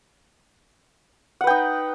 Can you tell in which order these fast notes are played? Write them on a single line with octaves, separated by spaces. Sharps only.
F#5 B4 G5 D#4